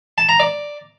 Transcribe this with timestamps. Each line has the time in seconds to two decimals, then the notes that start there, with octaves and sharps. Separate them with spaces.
0.18 A5
0.29 A#5
0.40 D5